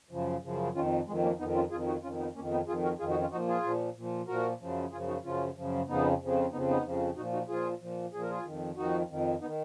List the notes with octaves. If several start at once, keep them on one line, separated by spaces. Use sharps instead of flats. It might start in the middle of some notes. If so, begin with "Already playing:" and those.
F#2 C#3 F3
F#2 C#3 F3
F2 D#3 C#4 F4
F2 D#3 G#3
A#3 C#4
F2 D#3 B3 D#4
C#4 F4
F2 D#3 F4 G#4
D#4 F#4
F2 D#3 C#4 F4
B3 D#4
F2 D#3 A#3 C#4
B3 D#4
F2 D#3 F4 G#4
F#4 A#4
F2 D#3 F4 G#4
D#4 F#4
C#4 F4
A#2 F3 D#4 F#4
F4 G#4
A#2 F3
A#2 F3
A#2 F3 F#4 A#4
F#2 C#3 F3
F#2 C#3 F3 F4 G#4
D#4 F#4
F#2 C#3 F3 C#4 F4
F#2 C#3 F3
F2 C#3 F3 B3 D#4
F2 C#3 F3
F2 C#3 F3 B3 D#4
B3 D#4
F2 C#3 F3
A#2 F3 D#4 F#4
D#4 F#4
A#2 F3 F4 G#4
A#2 F3
A#2 F3 G#4
A#4
F4 G#4
F2 D#3
F2 D#3 D#4 F#4
F2 D#3
B3 D#4
D#3